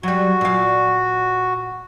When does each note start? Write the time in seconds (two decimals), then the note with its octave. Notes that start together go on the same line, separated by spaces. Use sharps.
0.03 F#3 G3 F#4
0.41 A#2 F5